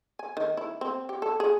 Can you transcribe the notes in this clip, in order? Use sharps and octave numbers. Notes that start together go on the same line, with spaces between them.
G#5
D#3
E4
C4
G4
A4
G#4